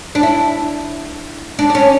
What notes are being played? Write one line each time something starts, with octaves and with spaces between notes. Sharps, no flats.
D4
E4
D4
D4
C#4